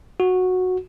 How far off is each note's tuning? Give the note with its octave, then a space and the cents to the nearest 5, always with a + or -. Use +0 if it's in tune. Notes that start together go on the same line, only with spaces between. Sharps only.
F#4 -10